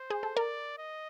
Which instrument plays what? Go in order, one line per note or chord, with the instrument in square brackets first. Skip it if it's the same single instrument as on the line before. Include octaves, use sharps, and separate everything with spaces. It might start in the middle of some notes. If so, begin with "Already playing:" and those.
Already playing: [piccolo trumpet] C5
[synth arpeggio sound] G#4
A4
[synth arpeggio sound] A#4 [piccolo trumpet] D5
[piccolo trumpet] D#5